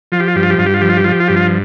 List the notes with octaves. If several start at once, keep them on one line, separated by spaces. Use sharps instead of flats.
F3 F4
G4
F4
G2 G4
F4
G4
G2 F4
G4
F4
F3 G4
F4
G4
F3 F4
G4
F4
G2 G4
F4